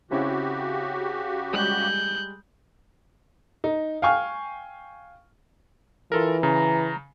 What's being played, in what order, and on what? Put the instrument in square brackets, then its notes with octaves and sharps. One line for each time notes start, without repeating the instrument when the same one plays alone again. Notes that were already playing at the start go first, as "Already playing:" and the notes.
[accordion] C#3 F#4 G4 [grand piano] C4 C#4 E4
[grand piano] G3 G#3 [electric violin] F#6 G6
[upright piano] D#4
F5 G5 G#5 C#6 F6
[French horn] E3 [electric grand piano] F4 A4 A#4
[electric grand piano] C#3 [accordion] A#5